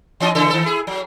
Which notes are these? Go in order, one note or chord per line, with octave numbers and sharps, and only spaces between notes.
E3 C#4 D#5
C#3 E3 A4
D#3 A4
E4 G#4
F#3